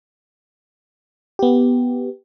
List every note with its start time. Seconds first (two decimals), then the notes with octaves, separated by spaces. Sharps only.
1.39 B3 G4